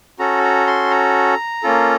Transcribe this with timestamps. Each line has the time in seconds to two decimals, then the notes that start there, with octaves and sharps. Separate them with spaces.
0.19 C#4 F#4 A4 A#5
0.43 A#5
0.67 C6
0.91 A#5
1.63 A#3 C#4 F4 A4